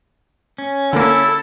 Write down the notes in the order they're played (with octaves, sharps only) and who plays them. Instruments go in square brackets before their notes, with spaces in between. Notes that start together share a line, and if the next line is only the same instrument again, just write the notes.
[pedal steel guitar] C#4
[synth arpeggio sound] D3 A#3 [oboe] E4 [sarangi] A4